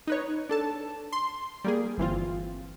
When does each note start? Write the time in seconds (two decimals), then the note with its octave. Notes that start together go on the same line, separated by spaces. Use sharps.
0.07 D#4 B4 C#5
0.49 D4 A4 A5
1.12 C6
1.64 G3 A#3 G#4
1.98 G1 E3 C4 F4